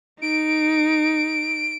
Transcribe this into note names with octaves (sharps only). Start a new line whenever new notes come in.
D#4 D7